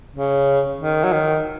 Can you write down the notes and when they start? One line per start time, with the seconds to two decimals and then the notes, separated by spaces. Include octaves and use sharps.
0.13 C#3
0.79 D#3
1.04 F#3
1.13 D#3